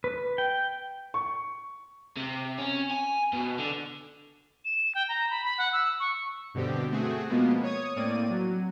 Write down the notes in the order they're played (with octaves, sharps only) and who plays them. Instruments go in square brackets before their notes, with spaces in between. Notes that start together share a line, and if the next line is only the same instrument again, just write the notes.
[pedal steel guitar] B4
G5
[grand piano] C#6
[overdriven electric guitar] C3
C#4
G#5
B2
D3
[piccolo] E7
G5
A#5
B5
B5
F#5
E6
C#6
[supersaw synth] G2 B2 D3 C4 G4
A3 C4 F#4 G#4
B2 F3 G#3 A#3 B3
C#5 D#6 G#6
A2 A#3 C4 D5 D#7
F#3